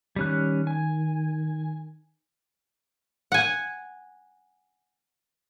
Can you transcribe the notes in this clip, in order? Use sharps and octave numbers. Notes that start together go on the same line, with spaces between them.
D#3 G3 C#4 F#6
G#5
F#5 G#5